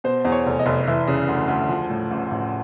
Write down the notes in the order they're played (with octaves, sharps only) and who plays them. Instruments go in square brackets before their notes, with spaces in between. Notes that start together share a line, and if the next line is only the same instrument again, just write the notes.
[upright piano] B2 C5
E2
C#5
F1
D#5
F1
E3 E5
C#3
D2
D2
F3
A2
A1
A1